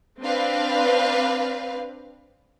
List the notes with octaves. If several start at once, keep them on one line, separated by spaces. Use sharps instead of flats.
C4 D4 B4 F5